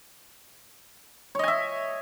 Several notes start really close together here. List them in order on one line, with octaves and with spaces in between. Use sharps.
C#5 D#5 G#5 E5